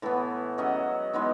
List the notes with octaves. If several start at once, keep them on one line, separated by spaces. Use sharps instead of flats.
A2 E3 B3
F#3 C#4 G#4 D#5
E3 G#3 B3 D#4